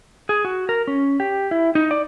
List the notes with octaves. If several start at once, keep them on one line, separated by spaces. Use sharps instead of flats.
G#4
F#4
A#4
C#4
G4
E4
D#4
D5